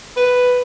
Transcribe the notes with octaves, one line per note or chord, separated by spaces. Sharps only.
B4